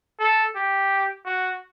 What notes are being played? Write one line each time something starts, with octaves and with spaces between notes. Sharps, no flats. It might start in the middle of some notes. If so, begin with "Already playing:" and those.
A4
G4
F#4